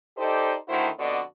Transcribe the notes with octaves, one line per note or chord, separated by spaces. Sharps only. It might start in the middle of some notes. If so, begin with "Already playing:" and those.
D#4 G4 A4 C5 D5 D#5
D3 D#3 A3 E4 F#4 C5
F2 D3 B3 F#4 D5 D#5